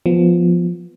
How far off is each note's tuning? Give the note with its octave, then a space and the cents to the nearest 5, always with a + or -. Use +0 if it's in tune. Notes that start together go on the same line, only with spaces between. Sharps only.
F3 +0 B3 +0